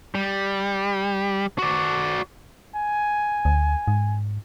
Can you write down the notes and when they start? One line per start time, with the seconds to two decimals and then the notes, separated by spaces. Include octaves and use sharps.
0.15 G3
1.58 F#4 D5
2.75 G#5
3.45 D2
3.88 G#2